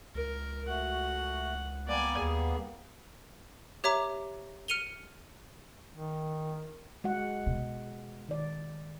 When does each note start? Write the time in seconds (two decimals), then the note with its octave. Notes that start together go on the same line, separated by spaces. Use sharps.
0.15 C#2 A#4
0.68 A3 F#4 F#5
1.88 G3 A#3 B3 D5 G#5
2.17 D#2 G#4
3.84 G4 C#5 E5 A#5 D6
4.68 F6 C#7 D#7 F7 G7
5.93 D#3
7.04 G#3 F#4 F#5
7.46 B2
8.29 D#3 D5